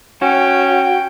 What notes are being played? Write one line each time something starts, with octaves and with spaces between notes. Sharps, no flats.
C#4 F#4 G5